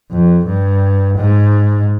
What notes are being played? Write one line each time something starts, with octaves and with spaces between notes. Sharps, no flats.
F2
G2
G#2